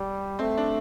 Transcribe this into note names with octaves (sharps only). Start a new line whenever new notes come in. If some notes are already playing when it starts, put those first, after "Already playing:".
Already playing: G3
A3 C4
D4